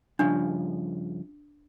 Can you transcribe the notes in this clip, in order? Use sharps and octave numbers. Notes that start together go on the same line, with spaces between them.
G2 C#3 F3 D4